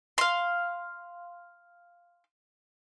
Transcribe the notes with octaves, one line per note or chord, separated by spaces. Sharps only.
F5 C6